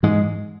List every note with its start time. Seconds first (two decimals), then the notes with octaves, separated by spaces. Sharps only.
0.03 G#2 E3 G#3